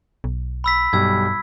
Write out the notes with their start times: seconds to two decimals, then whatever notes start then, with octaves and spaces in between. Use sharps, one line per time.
0.24 B1
0.64 B5 E6 B6
0.93 B1 G2 G3 E6 G#6